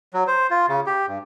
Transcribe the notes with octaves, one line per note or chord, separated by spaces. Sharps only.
F#3
C5
F4
C#3
G4
G2